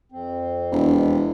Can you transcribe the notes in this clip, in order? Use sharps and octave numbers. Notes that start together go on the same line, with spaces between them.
F2 C4
E1